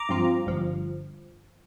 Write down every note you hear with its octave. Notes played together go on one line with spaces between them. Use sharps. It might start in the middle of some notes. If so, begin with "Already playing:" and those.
Already playing: A#5 D6
G2 F3 C4 F4
G1 G2 F3